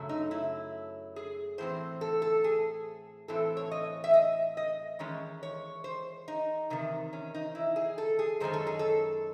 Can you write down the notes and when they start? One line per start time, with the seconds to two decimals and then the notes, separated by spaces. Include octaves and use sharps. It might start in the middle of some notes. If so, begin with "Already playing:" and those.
Already playing: F#2 C#3 F#3 A3
0.09 D#4
0.31 E4
1.16 G#4
1.58 A2 E3 C4 C5
2.01 A4
2.22 A4
2.44 G#4
3.28 A2 E3 C4 A4
3.57 C#5
3.71 D#5
4.04 E5
4.14 D#5
4.57 D#5
4.99 E2 D#3 G#3 C#4
5.43 C#5
5.84 C5
6.28 D#4
6.70 E2 C3 D#3
7.13 C#4
7.34 D#4
7.55 E4
7.76 G#4
7.98 A4
8.19 G#4
8.40 F#2 D#3 G#3 C#4 C5
8.53 A4
8.67 G#4
8.79 A4